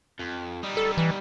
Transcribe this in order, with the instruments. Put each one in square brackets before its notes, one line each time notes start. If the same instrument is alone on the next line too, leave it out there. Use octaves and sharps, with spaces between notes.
[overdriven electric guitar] F2
G3 D#4
[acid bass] A4
E3